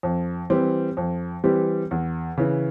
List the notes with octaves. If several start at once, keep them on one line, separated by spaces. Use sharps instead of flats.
F2
E3 G3 C4 G4
F2
E3 G3 C4 G4
E2
C#3 E3